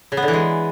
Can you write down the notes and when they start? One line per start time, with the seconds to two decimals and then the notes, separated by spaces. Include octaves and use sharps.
0.12 C#3
0.17 B3
0.23 D3
0.28 E3
0.33 G#3